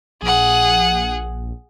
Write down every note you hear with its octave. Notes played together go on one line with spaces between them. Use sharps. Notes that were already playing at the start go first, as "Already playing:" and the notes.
A#1 G#4 F#5